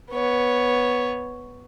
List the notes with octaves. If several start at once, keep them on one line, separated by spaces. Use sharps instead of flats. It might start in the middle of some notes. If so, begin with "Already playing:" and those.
B3 C#5